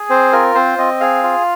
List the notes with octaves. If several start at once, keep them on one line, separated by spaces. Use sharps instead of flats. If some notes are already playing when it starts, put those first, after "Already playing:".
Already playing: G#4
C4 C5
F4 A#4
C4 C5
C4 D#5
G#4 F5
F4